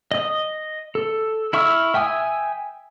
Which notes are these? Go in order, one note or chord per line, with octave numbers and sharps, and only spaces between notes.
D#5 D#6
A4
E4 E5 C#6 E6 F6
E5 G5 G#5 D#6 E6